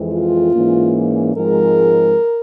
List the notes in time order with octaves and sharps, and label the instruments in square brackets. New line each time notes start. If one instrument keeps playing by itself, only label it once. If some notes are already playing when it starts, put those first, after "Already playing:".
Already playing: [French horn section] F2 E3 G#3 C4
F4
G#2 E3 A#3 C#4
G#2 F3 G#3 C4 A#4